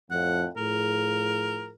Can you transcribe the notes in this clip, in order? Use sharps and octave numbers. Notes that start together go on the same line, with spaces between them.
F2 A2 F#5
A2 F3 G#4 A#4